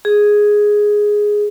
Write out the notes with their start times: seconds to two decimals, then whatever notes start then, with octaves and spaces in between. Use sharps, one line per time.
0.05 G#4